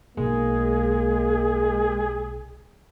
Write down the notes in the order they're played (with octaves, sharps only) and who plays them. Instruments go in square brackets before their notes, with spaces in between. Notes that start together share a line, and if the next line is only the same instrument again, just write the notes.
[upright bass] B1 [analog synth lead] G#3 [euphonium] A#3 [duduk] G#4